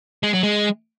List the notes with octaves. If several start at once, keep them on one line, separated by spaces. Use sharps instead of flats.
G#3
F#3
G#3